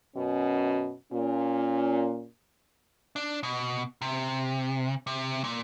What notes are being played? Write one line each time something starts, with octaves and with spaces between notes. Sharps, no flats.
F#2 B2 C#4
A#2 C#4
D4
B2
C3
C3
A#2